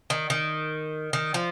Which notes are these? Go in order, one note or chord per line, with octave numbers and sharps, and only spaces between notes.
D#3
D#3
D#3
F3